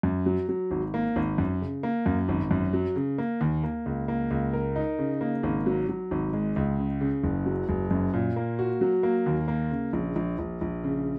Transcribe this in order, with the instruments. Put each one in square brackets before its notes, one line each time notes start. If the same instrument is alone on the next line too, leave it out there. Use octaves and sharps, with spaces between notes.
[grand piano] F#2
F#3
F#3
G#1
A#3
G#1
F#2
C#3
A#3
F#2
G#1
F#2
F#3
C#3
A#3
D#2
A#3
C#2
A#3
C#2
A#4
D#4
C#3
A#3
G#1
F#3
F#3
G#1
G#3
C#2
C#3
C#3
F#1
F#3
F#1
F#2
A#2
A#3
F#4
F#3
A#3
D#2
A#3
C#3
A#1
A#1
A#1
A#1
C#3